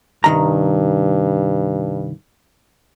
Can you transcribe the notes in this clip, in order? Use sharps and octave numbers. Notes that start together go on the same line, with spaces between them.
C2 G2 D#3 A#5